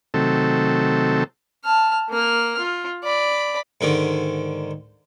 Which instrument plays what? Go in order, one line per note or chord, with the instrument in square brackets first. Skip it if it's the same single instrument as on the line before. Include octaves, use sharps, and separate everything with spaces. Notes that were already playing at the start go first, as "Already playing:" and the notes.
[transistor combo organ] C3 D#3 F#3 A3 C4 A4
[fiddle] A5 F6
A#3 F6
F4
D5 B5
[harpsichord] G#2 D3 D#3